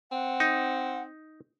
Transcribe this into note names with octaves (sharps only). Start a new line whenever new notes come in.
C4 F#5
D#4